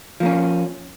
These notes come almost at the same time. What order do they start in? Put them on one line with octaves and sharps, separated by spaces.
F3 A#3 C#4